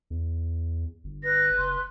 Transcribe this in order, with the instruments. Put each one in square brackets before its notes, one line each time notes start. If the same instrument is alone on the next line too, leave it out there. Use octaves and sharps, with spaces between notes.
[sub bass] E2
G1
[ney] B4 [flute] A#6
[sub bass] F#1 [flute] C6